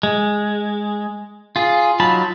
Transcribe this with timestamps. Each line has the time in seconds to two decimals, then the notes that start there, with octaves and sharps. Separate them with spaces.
0.03 G#3
1.56 F4 G#4
2.00 F#3 D#4 F4 A5 B5